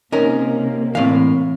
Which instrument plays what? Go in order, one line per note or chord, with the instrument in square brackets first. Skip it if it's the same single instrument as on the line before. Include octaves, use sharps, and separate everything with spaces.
[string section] C3 A#3 [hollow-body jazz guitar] C#4 D#4 A#4
[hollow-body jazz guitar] A2 F5 [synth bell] E3 C4